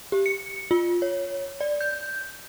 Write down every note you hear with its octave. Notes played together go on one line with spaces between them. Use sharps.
G4
C#7
F4
C#5
D5
G6